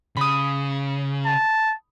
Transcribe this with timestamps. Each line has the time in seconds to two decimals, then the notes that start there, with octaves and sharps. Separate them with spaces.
0.17 C#3 B5 D#6
1.26 A5